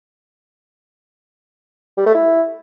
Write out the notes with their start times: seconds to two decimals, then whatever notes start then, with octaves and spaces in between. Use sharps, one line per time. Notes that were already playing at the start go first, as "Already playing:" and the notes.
1.97 G3
2.06 A3
2.14 E4